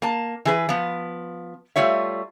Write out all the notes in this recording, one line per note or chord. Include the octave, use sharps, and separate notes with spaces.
A#3 A5
E3 G#4 B4
F3 B3
G3 A3 F4 C#5 E5